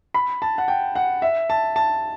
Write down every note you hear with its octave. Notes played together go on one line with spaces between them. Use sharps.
B5
A5
F#5
G5
F#5
E5
A5
A5